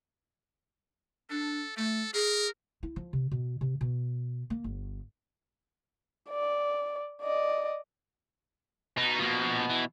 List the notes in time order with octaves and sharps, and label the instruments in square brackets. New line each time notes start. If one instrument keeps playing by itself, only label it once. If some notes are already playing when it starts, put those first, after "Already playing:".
[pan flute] D4 [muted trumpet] A4
[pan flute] A3 [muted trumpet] A4
[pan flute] G#4 [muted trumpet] A#4
[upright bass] E4
F3
C3
B2
C3
B2
A#3
G1
[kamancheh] D5
D5 D#5
[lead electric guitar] B2 [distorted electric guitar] D#4
[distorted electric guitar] F3 A#3
E3